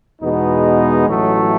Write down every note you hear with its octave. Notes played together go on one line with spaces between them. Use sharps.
E2 B2 G#3 B3 D#4
A1 A2 F#3 A3